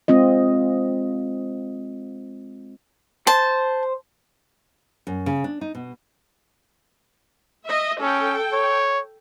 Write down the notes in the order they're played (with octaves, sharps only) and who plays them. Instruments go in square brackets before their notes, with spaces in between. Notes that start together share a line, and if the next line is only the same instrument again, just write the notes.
[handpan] G#3 C4 F4 D#5
[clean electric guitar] C5 [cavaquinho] A5
[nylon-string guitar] F#2
C#3
D4
D#4
B2
[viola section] D#5 E5
[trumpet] C#4 [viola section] A4 G5
[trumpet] C#5